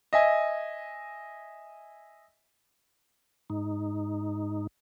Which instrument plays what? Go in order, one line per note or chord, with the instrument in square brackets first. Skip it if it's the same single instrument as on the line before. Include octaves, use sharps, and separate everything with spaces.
[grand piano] D#5 E5 G#5
[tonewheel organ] G#2 D#4